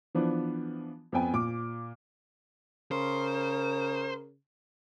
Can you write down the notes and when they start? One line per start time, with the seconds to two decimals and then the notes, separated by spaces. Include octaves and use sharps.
0.15 E3 F3 B3 D4
1.12 F2 B3 G5 G#5
1.33 A#2 D6
2.91 C#3 A#4 C5